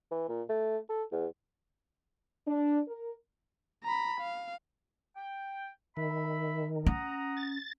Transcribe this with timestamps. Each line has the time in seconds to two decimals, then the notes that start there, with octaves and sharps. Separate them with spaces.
0.11 E3
0.29 A#2
0.49 A3
0.89 A4
1.12 E2
2.47 D4
2.88 A#4
3.83 A#5 B5
4.20 F5
5.16 G5
5.97 D#3 E5 B5
6.86 C#4 F#5 A#5 D#6
7.37 A6